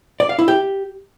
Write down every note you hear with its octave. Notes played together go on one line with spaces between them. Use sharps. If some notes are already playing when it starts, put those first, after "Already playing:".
D5
F5
E4
G4